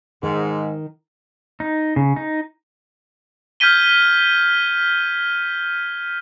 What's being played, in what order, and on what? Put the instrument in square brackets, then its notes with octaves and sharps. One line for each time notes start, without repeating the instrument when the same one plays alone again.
[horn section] G#2 [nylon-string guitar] D#3
[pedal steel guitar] D#4
C#3
D#4
[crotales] F6 G6 G#6 B6 D#7 G7